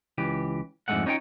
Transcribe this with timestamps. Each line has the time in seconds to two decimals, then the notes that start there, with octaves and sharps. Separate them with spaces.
0.18 C#2 E3 G4
0.88 F2 G#2 D3 G#3 A3 F#5
1.06 C#4 D#4 F4 F#4 C#5 G5